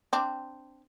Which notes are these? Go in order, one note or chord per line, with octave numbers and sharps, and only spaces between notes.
C4 D4